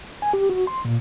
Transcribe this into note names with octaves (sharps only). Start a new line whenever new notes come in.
G#5
G4
F#4
C6
A#2